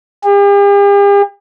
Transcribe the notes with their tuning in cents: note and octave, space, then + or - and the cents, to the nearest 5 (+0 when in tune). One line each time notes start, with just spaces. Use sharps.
G4 +45